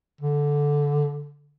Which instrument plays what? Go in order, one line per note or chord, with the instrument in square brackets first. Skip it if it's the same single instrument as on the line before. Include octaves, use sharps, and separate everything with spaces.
[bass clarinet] D3